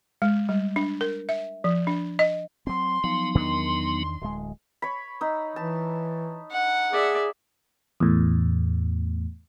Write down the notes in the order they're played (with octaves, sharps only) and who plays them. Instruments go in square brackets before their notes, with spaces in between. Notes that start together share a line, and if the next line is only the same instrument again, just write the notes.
[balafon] G#3
G3
D4
A#4
E5
F3
D4
D#5
[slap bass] F#3 C4 [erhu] C6
[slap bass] F3 [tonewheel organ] F#3 B3 D#4
[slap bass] E2 D#3 D4 [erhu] C6
[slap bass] D1 G#3
[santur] C#5 B5
D#4 E6
[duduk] E3 [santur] A5
[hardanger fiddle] F#5
[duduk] G#4 [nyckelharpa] D5 E5
[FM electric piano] E2 A2